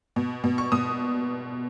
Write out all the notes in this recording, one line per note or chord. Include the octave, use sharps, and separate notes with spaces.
B2
B2
C#6
B2 D#6